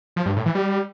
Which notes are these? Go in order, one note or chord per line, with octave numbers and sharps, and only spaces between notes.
F3
G2
A2
E3
G3